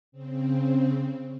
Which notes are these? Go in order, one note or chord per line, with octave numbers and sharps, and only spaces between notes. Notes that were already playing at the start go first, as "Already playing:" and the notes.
C#3 C4